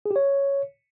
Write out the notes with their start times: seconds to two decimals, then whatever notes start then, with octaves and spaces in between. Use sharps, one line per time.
0.06 G#4
0.11 G4
0.16 C#5